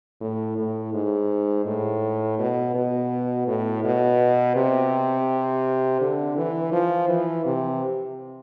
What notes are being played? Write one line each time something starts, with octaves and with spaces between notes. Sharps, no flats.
A2
A2
G#2
A2
B2
B2
A2
B2
C3
D3
E3
F3
E3
C3